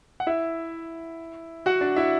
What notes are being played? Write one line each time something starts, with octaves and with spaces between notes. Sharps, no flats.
F#5
E4 E5
F#4 F#5
D4 D5
E4 E5